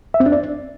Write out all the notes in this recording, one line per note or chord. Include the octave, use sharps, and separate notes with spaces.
E5
C4
D4
D5